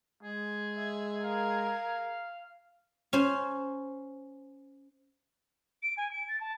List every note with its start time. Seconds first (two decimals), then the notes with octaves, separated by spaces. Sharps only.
0.23 G#3 G#4
0.76 E5
1.24 A#4 F5
3.13 C#4 C5
5.83 D7
5.97 G#5
6.11 D7
6.28 A6
6.40 A5